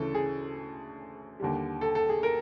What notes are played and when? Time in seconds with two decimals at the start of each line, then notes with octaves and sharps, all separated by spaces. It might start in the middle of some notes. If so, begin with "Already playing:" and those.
Already playing: D2 C#3 E3 A4
0.15 G#4
1.40 D#2 D3 G3
1.81 A4
1.95 A4
2.09 G#4
2.23 A#4